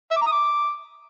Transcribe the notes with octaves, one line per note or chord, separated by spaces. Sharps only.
E5
D6
A#5
D#6
D6